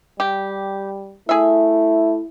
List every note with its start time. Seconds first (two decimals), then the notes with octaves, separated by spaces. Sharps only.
0.20 G3 G4
1.29 A3 E4 G#4 E5